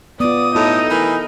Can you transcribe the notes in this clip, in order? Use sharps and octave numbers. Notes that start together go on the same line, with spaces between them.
B3 F4 D5 D#6
A2 D#4 F#4 A4
E3 A#4